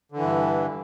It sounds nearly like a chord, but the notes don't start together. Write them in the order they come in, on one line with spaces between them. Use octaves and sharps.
D3 E3 G2